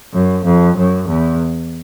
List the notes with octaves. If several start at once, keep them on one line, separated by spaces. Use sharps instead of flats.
F#2
F2
F#2
E2